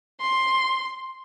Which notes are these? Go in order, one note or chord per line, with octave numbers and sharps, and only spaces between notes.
C6